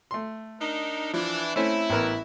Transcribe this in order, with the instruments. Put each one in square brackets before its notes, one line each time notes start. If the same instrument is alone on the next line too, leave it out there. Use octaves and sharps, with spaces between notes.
[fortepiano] A3 C6
[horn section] D4 D#4 A#4
[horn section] E3 D4 [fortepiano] F3
[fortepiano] A3 C4 C#4 [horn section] E4
[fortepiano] A1 B3 A#4